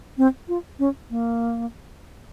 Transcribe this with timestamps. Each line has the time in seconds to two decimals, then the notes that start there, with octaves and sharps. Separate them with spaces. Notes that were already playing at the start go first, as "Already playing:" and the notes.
0.18 C4
0.48 F4
0.79 C#4
1.10 A#3